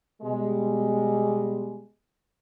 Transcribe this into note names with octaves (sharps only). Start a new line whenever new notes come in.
B2 G3 G#3